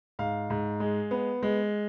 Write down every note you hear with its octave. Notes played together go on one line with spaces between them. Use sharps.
G#2 F5
G#2
G#3
B3
G#3